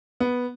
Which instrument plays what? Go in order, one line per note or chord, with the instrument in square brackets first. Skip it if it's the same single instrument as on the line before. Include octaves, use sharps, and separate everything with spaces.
[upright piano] B3